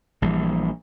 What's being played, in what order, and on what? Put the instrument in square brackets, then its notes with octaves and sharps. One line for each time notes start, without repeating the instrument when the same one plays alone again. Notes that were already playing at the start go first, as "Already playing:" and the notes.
[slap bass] A#1 E3 G3